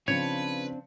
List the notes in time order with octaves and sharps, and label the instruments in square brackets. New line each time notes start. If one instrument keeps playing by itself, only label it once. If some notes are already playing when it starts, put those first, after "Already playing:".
[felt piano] C#3 F3 C#7 [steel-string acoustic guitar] C4 D4 [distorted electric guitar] B4 [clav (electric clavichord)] C#5